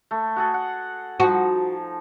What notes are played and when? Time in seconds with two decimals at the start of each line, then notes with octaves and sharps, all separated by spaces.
0.11 A3
0.36 F#4 G#4 A4
0.54 F#5
1.20 F3 D#4 F#4